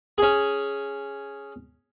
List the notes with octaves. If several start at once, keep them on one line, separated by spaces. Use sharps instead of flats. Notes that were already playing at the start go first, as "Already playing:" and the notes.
C#4 G#4